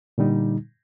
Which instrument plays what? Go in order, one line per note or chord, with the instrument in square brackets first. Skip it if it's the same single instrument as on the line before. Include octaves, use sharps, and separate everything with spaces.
[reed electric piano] A#2 D3 G3 D#4